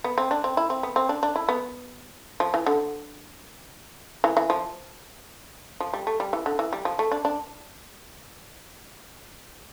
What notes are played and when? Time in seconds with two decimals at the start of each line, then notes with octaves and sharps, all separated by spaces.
0.04 B3
0.18 C4
0.31 D4
0.44 C4
0.57 E4
0.70 C4
0.83 B3
0.96 C4
1.09 D4
1.23 D4
1.36 E4
1.49 B3
2.40 F3
2.54 E3
2.66 D3
4.24 E3
4.37 E3
4.50 F3
5.80 F3
5.93 G3
6.07 A3
6.20 G3
6.33 E3
6.46 D3
6.59 E3
6.73 G3
6.85 F3
6.99 A3
7.12 D4
7.25 D4